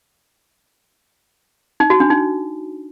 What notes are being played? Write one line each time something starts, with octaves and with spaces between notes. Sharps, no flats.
D#4
F#4
D4
D#4